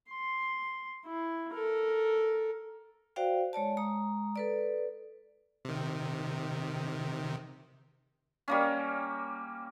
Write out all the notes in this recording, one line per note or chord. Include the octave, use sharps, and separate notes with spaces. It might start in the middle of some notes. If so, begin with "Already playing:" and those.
C6
E4
A4 A#4
F#4 C5 D5 F5 G5
G#3 C#5 D5 A5
G#3 A#5 D#6
A4 B4 D5
C3 D#3
G3 A#3 C#4